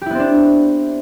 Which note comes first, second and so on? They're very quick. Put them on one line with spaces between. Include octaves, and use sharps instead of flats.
G4 E4 B3 C4 D4